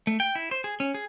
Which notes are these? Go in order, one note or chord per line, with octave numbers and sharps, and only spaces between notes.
A3
G5
E4
C5
G#4
C#4
G#4